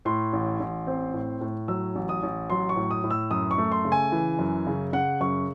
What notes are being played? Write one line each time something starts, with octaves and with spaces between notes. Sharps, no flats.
A2 C6
A1
A1
C4
A2
A2
F#3 E6
A1
D#6
A1
F#3 C6
C#6
A2
D#6
A2
E6
F#2 D#6
C#6
A3
C6
C#3
G#5
E3
F#2
C#3
C#3 F#5
F#2 C#6